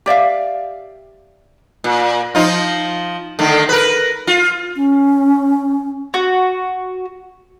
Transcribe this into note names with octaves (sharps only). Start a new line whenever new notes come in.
G4 D5 E5 F5
A#2
F3 D#4 F4
D3 D#3 A3
A#4 B4
F4
C#4
F#4